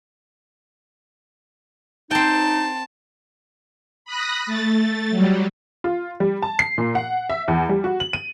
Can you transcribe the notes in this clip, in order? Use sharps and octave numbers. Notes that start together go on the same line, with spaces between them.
C4 D#4 G5 A5
B5 D#6 F#6 A#6
A3 A6
F#3 G3
F4
G3
A5
C7
A#2
F#5
E5
E2
G3
F#4
F#7
D#7